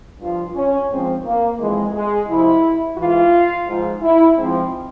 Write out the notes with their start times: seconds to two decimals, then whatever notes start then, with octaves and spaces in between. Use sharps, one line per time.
0.20 G2 F3 F4
0.55 C#4
0.90 G#2 F3 C4
1.25 A#3
1.60 F2 E3 G#3
1.94 G#3
2.28 F2 C3 F3 E4
2.97 G#2 E3 F4
3.68 G#2 F3
4.02 E4
4.37 G#2 F3 C4